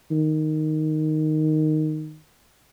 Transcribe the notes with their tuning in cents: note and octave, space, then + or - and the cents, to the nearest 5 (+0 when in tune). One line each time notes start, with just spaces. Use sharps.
D#3 -5